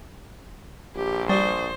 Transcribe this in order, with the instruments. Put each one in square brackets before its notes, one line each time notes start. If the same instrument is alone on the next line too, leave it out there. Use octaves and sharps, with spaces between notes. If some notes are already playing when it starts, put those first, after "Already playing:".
[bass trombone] A#1 [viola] G4
[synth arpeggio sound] G3 [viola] C5 [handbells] D5 C#6 D#6